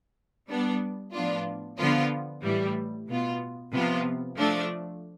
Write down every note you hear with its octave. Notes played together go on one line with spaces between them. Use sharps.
G3 B3 D4
A2 F3 B3 D4 F4
D3 F3 B3 F4
A2 E3 G3
B2 B3 F4
C3 F3 B3 F4
F3 A3 D4